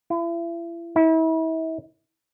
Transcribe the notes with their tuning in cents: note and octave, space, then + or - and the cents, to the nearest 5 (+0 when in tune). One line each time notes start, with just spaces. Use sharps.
E4 +40
E4 -35